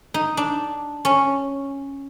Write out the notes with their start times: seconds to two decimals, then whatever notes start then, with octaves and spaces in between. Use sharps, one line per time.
0.14 D#4
0.37 D4
1.05 C#4